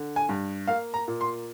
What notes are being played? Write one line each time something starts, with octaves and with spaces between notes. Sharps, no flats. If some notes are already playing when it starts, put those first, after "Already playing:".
Already playing: D3
G#5
G2
A#3 F5
A#5
A#2
C6